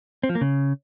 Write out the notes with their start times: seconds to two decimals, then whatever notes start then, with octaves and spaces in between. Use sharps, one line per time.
0.23 C4
0.29 F3
0.35 A#3
0.41 C#3